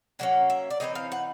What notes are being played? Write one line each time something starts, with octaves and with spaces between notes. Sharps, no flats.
D3 F#3 A#3 C#4 F#5
E5
D5
E3 G#3 C4 D#4 D#5
F5
F#5